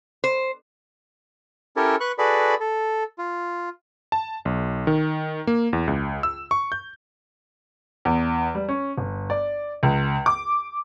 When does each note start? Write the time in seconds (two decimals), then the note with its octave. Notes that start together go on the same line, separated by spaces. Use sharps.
0.24 C5
1.77 C#4 E4 G4 A4 A#4 C#5
2.00 B4 C#6 F#6
2.19 F#4 G#4 A4 B4 D5 B5
2.60 A4
3.18 F4
4.12 A5
4.45 B1
4.87 D#3
5.47 A#3
5.73 E2
5.87 C#2
6.23 E6
6.51 C#6
6.72 G6
8.05 E2
8.55 G3
8.69 C#4
8.98 G1
9.30 D5
9.83 C#2
10.26 D6